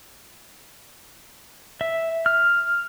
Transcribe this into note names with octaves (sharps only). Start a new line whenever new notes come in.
E5
F6